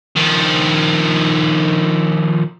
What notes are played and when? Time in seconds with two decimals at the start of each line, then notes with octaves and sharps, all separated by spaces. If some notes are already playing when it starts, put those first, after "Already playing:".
0.16 D#3 F3